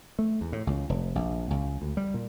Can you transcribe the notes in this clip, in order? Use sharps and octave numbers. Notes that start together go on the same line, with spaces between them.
A3
E2
A2
C#2
F1
A#1
C#2
D2
G3
A#2